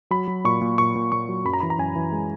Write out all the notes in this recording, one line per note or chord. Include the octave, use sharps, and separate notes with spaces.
F#3 B5
F#3
A#2 C#6
A#2
A#2 C#6
A#2
A#2 C#6
F#3
F#2 B5
A#5
E3 B5
A#5
F#2 G#5
E3
G#3